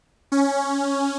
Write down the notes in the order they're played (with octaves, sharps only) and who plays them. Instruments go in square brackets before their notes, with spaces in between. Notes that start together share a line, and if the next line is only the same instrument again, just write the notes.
[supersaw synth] C#4